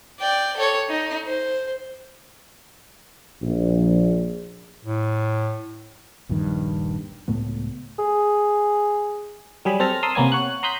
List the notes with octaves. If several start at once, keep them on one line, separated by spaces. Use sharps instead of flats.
D5 G5
A4 C#5
D#4
C5
A#1
A2
D#1 A#1 G2 D#3
C#2 A2 A3 B3
G#4
F#3 G3 G#4 B5
C4 A4 F6 A#6
A#4 A5 C6 D#6 E6
C3 A#3 B3 C#4 G#5
C#5 F#5 F#6
A#5 C6 D#6 F#6 G6 B6